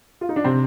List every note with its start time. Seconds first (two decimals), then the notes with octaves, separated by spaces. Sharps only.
0.21 F4
0.29 D#4
0.36 D4
0.44 C3 C4